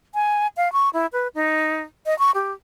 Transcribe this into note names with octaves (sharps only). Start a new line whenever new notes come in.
G#5
F5
C#6
E4
B4
D#4
D#5
C#6
G4